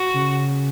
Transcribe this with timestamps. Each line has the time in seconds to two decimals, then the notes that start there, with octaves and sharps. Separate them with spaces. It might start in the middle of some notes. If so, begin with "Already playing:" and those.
Already playing: F#4
0.14 C#3